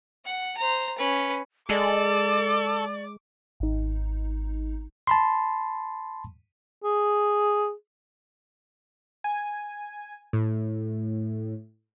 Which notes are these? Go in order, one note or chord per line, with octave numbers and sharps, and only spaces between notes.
F#5
C5 A#5
C#4 B4
G#3 A4 D5 D6
G#1 D#4
A5 B5 C6
G#4
G#5
A2